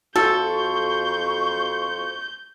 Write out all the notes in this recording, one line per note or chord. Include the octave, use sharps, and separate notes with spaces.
F2 F#4 A4 C6 C#6 G6